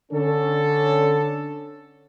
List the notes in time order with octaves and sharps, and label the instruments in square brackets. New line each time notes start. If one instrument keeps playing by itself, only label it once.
[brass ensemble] D3 C#4 A4